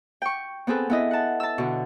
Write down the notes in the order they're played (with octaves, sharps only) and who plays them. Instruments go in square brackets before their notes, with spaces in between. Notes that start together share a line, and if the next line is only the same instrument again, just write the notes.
[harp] G5 C#6
B3 C4 G#4 A4 B4
B3 E4 D#5
F#5 A5
A5 E6
B2 D3